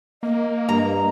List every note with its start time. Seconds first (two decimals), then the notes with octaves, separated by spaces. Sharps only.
0.23 A#3 D#5
0.69 G2 A#5